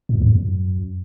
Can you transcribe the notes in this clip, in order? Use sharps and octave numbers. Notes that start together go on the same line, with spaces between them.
A2
E2
G#2
F#2